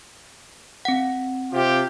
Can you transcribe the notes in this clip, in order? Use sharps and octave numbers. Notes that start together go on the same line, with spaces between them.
C4 F#5
C3 F4 G4